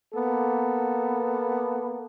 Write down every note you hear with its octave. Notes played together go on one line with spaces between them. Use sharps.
A#3 B3 A4